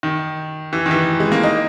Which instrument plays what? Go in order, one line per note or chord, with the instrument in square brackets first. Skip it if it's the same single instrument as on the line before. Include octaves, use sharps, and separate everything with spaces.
[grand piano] D#3
E3
D#3
E3
G#3
A#3
D#4